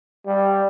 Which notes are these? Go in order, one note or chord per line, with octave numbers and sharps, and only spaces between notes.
G3